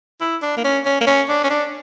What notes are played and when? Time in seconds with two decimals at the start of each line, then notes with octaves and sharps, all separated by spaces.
0.21 E4
0.42 D4
0.57 A#3
0.64 C#4
0.86 C#4
1.01 A#3
1.07 C#4
1.29 D4
1.44 C#4
1.50 D4